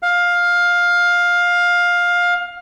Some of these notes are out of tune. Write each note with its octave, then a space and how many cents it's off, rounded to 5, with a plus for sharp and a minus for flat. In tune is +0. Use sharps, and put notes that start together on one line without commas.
F5 +15